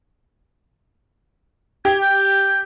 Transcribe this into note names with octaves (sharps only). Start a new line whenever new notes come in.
G4 G#6
G6